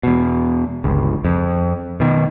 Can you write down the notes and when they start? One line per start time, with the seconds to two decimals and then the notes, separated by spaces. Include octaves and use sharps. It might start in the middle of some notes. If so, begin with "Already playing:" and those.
0.03 E2 B2
0.84 G1 C#2
1.25 F2
2.00 B2 D#3